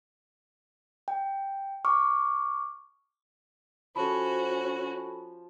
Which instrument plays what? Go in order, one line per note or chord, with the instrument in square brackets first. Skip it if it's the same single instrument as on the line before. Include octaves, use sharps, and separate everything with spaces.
[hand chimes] G5
C#6 D6 F6
[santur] F3 [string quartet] C#4 F#4 [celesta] A4 B5